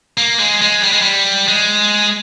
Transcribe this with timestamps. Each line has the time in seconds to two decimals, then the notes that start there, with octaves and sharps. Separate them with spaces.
0.18 A#3
0.39 G#3
0.62 G#3
0.83 G3
0.93 G#3
1.02 G3
1.48 G#3